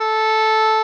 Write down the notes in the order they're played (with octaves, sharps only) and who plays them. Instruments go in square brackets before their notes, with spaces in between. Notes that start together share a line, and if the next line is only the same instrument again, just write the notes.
[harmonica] A4